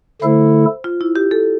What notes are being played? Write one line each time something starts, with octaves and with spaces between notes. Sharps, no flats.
D3 A3 E4 A4 C5
F4
E4
G4
A4